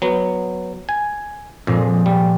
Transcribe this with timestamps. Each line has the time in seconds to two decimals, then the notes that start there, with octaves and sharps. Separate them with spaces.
0.02 F#3 B3
0.89 G#5
1.67 F2 A#2 F3 G#3
2.06 G3